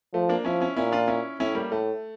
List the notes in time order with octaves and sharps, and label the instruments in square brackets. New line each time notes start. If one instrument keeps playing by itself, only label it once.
[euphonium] F3 [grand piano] A3
[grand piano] A#3 D4
[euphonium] F3 [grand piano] C#4 E4
[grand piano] C#4 E4
[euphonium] A#2 [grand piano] C#4 E4
[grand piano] D4 F4
C#4 E4
[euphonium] A2 [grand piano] C#4 E4
[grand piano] G3 A#3
[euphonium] A2 [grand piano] A3